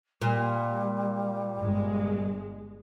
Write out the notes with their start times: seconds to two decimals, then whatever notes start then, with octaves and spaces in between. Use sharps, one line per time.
0.21 A#2 G3
1.58 G1 G#3